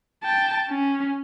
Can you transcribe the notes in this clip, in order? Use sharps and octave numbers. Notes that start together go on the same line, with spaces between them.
G5 A5
C#4